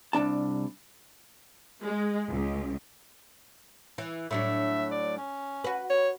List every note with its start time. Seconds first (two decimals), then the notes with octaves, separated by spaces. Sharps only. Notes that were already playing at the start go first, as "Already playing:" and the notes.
0.13 C2 G#3 D4 A5
1.85 G#3
2.30 C#2
3.98 E3
4.31 A2 F#3 D4 E5
4.91 D5
5.17 C#4
5.64 F#4 B4
5.90 C#5